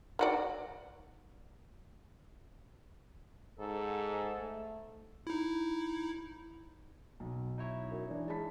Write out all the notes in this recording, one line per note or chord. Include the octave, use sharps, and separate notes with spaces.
D#3 F#4 D5
G#2 A4
A3
D#4 E4
B1
D#4 E4 C#5
F#2
E3 D4
G#3 A5 B5 B6